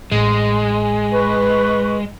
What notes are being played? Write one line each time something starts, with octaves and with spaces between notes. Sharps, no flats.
A1 A2 G#3
B4 C#6